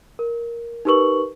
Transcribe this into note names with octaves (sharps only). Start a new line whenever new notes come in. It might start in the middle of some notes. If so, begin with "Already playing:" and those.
A#4
D#4 G4 A#4 B4 C#6 F#7